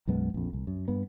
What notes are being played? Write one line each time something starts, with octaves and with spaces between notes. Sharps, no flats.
B1 F#2 G#3 B3
A#1 F2
C2
F#2
G2 B3